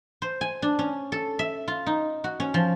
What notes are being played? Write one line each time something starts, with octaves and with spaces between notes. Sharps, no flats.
C5
G#5
D4
C#4
A4
E5
F4
D#4
F#4
C#4
F3